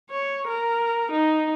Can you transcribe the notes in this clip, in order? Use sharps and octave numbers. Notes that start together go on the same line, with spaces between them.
C#5
A#4
D#4